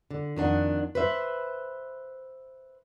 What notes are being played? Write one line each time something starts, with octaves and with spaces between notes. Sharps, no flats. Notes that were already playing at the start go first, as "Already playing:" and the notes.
D3
F2 D#3 D4 F#5
B4 C5 E5